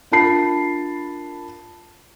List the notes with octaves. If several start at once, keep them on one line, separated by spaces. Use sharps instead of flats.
D4 F4 A#4 A5 B5 C7